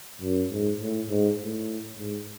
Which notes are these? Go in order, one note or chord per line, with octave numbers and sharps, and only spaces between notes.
F#2
G#2
A2
G#2
A2
G#2